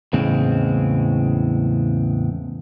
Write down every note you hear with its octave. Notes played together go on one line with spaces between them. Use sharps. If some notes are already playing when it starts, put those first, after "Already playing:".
E2 A2 C#3 G#3 C4